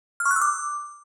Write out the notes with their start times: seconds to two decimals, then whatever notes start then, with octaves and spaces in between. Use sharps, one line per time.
0.20 F6
0.25 C#6
0.31 F#6
0.36 E6
0.41 D6